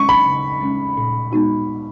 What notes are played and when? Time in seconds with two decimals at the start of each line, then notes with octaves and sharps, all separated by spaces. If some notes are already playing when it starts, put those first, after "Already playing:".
Already playing: G#3 C#4 C#6
0.09 B5
0.26 C#3
0.61 G#3 C#4
0.97 A#2
1.32 G#3 B3 D#4 F#4